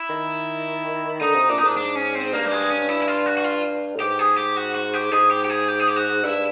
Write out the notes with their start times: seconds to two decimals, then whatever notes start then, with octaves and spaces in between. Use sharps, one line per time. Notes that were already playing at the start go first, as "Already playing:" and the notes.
Already playing: E4
0.10 D#3
1.21 D3 D#4
1.35 C3
1.49 A#2 D4
1.58 D#4
1.63 G#2 D4
1.77 D4
1.95 C#4
2.15 C4
2.33 G2 A#3
2.46 G3
2.51 G#3
2.70 C#4
2.89 E4
3.02 E4
3.08 F4
3.26 F#4
3.37 F#4
3.44 F4
3.96 A2
4.00 G#2 G4
4.19 G#4
4.37 G4
4.56 F#4
4.75 F#4
4.94 G4
5.12 G#2 G#4
5.31 G4
5.45 G4
5.50 G#4
5.68 G4
5.80 G#4
5.88 G4
5.96 F#4
6.24 G2 E4